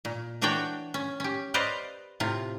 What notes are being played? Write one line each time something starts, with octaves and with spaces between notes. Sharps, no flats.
A#2
E3 D4 F#4 C#5 D5 G5
C#4
C#4 G4
B4 C5 D5 D#5 F5
A2 C3 F4